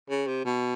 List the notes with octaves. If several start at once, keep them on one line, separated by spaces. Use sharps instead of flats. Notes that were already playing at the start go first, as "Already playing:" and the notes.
C#3
C3
B2